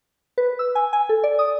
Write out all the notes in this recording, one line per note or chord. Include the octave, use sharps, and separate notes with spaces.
B4
E6
G#5
G#5
A4
D5
D#6